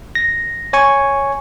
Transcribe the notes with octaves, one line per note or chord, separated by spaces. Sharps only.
A#6
C#5 G#5 C#6